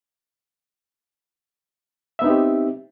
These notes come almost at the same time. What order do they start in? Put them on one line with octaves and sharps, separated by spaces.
E5 B3 D#4 C4 G4